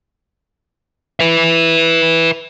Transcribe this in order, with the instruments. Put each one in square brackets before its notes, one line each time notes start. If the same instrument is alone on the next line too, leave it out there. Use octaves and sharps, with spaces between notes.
[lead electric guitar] B4 E5